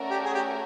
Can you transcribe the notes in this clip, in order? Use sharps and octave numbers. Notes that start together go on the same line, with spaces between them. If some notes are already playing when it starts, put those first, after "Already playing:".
Already playing: A3 C#4 F#4 A#4 D5
G4
G#4
G4